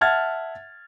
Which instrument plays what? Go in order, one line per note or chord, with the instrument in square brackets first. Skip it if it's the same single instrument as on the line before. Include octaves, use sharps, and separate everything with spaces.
[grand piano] E5 F#5 A5 F6 G#6 A6